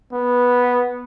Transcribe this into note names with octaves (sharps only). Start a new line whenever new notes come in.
B3